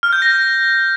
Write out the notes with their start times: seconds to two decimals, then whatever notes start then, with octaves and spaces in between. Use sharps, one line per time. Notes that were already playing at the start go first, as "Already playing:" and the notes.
0.03 F6
0.13 G6
0.22 A#6